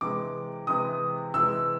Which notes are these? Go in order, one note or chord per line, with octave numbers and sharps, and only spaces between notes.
C3 E3 G#3 D6
C3 E3 G#3 D#6
C3 E3 G#3 E6